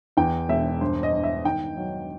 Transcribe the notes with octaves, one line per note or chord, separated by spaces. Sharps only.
E2 G5
E1 E5
G2 C5
D#5
G2
E5
D#3 G5
F#3